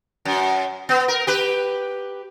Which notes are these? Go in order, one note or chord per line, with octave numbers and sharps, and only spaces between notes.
F#2
B3
A#4
G4 B4